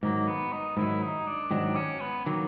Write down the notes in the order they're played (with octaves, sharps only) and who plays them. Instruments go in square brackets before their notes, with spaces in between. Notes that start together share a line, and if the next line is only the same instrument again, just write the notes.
[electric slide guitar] G#2 D#3 F#3 [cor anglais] A#3
[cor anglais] B3
D#4
[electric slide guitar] G#2 D#3 F#3 [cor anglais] E4
[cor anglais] D#4
D4
[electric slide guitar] G#2 D#3 F#3 [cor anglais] D4
[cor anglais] C#4
B3
[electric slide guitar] D#3 F#3 [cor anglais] A#3